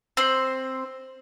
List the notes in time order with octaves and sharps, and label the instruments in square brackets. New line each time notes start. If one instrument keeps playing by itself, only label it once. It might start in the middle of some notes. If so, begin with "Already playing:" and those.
[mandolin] C4 C5